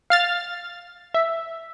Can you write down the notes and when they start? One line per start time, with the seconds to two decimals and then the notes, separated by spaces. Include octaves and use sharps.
0.10 F5 F6 A6
1.14 E5